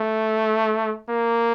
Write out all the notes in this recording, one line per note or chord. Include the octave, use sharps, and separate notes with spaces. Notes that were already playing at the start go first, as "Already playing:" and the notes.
Already playing: A3
A#3